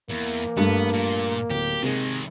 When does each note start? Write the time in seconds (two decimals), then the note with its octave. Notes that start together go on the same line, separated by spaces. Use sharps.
0.10 E2 A#3
0.57 G2 A3 B3
0.93 A#2
1.50 D1 G4
1.83 C3 D#3 G#3 G#4